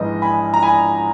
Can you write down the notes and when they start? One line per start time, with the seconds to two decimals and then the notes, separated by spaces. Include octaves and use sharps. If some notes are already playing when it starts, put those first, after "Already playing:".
Already playing: A#1 G#2 E3 G#3 B4 D#5
0.22 G#5 B5
0.54 A#5
0.62 G#5 B5